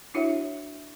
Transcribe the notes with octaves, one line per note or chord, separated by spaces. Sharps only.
D4 E4 F#4 C#5 E5 F#5